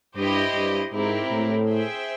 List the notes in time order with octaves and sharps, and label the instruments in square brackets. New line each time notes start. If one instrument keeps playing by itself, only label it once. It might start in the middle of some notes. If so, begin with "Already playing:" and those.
[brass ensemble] G2 [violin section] E4 G4 C5 D#5
[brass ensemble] G2
[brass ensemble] G#2 [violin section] C4 E4 G4 A#4
[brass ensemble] A2
[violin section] G#4 C5 E5 G5